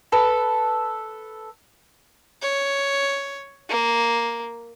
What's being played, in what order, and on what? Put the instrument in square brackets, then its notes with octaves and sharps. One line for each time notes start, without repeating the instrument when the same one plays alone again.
[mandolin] A4 B4
[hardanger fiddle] C#5
A#3